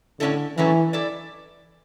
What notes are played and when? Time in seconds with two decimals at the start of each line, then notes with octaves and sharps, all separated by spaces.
0.20 A2 D3 F#3 C#4 E4 A4
0.57 A2 E3 F#3 C#4 E4 A4
0.93 E4 A4 D5